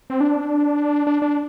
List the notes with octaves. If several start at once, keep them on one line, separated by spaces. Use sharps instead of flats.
C4
D4
D4
D4